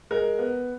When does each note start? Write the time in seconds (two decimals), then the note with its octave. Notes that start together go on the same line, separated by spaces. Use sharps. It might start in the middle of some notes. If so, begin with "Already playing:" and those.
0.11 G#3 A#4
0.39 B3